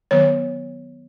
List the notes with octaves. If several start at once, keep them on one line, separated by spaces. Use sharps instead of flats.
D#3 F#3 B3 C#5